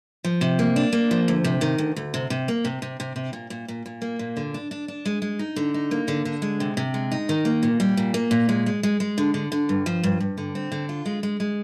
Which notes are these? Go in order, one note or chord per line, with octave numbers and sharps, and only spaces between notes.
F3
C3
A#3
D4
A#3
F3
D2
C3
D#3
D2
D2
C3
C3
A#3
C3
C3
C3
C3
A#2
A#2
A#2
A#2
A#3
A#2
D3
D4
D4
D4
G#3
G#3
D#4
D3
D#4
A#3
D3
D3
G#3
C3
C3
G#3
D#4
D#3
A#3
A#2
G3
A#2
A#3
A#2
G#3
G#3
G#3
G#3
D3
D3
D3
G2
F3
G2
G2
D3
C4
D3
F4
G#3
G#3
G#3